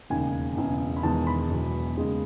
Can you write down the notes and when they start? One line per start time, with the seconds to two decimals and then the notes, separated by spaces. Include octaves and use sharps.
0.10 E1 D#2 C#3 G#5
0.57 E1 E2 C#3
0.97 B5
1.03 E1 E2 D#3 G#3 A5
1.27 B5
1.50 E1 E2 B2 F#3
1.97 D#2 C#3 G#3